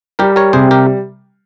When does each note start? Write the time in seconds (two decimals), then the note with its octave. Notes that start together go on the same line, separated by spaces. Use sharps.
0.19 G3 G4 A#4
0.36 A#4 C#5
0.53 C3 G#4 C5
0.71 G4 A#4